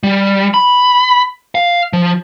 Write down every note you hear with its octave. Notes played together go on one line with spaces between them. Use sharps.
G3
B5
F5
F3